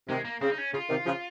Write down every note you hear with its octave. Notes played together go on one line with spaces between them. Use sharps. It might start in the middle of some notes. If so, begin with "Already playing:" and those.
C3 D#3 G#3
A#3
C#3 C4
D#4
C#4
C#3 F4
C3 D#3
C#3 F3